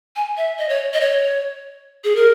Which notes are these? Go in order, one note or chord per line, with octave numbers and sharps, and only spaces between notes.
G#5
E5
D#5
C#5
D#5
C#5
G#4
A#4